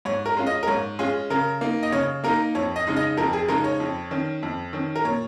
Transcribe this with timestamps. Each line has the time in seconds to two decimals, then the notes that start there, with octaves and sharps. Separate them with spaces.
0.05 G#2 C#5
0.26 A#4
0.37 G#3 C#4 F4
0.47 D#5
0.63 A#4
0.67 G#2 C#5
0.99 G#3 C#4 F4 G#4
1.30 C#3 A#4
1.61 A#3 D#4
1.83 D#5
1.92 C#3 C#5
2.24 A#3 D#4 A#4
2.55 F2 C#5
2.76 D#5
2.87 C#3 G#3 D#4
2.97 D#5
3.17 F2 A#4
3.33 G#4
3.48 C#3 G#3 D#4 A#4
3.64 C#5
3.80 F2
4.11 D#3 C#4
4.43 F2
4.73 D#3 C#4
4.96 A#4
5.05 A#2 C#5